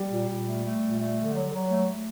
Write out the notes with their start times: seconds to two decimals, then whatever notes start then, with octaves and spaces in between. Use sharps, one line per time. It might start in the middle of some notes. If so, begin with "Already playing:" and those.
Already playing: G3
0.11 A#2
0.28 A#2
0.46 A3
0.63 A3
0.82 A#2
0.99 A3
1.17 D3
1.34 F#3
1.52 F#3
1.70 A3
1.87 A3